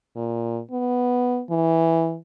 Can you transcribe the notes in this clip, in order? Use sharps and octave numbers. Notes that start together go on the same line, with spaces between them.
A#2
B3
E3